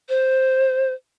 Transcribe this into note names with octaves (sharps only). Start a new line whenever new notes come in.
C5